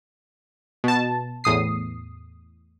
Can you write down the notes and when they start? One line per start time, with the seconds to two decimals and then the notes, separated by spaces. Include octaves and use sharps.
0.84 B2 A5
1.44 E2 A2 D#6 C7